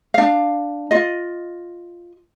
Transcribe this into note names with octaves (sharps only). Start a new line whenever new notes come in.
D4 F5
F4 D#5